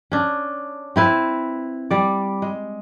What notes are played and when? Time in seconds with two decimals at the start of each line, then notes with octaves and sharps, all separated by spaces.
0.12 C#4 D4
0.96 C4 E4 B4
1.91 G3 D5
2.42 G#3